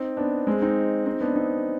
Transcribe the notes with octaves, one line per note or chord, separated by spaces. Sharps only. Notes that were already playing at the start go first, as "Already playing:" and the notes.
Already playing: C4 D#4
B3 D4
G#3 C4
C4 D#4
C4 D#4
B3 D4
C4 D#4